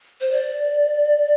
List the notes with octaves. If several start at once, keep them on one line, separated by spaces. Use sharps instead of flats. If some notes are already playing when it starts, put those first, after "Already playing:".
C5
D5